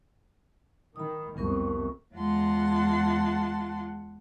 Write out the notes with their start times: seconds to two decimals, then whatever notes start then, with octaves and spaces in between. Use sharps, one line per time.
0.96 D#3 B5 D#6
1.37 C2 F2 B3 A#4 C#6
2.15 E2 G#3 F4 F#5 A5 C6